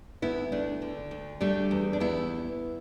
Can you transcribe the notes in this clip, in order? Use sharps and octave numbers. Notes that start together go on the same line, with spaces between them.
D2 B3 E4
D2 A3 D4
D3
D2
G3 A3 D4
E2
D4
E2 B3 E4